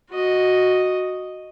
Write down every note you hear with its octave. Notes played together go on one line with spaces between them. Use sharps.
F#4 D#5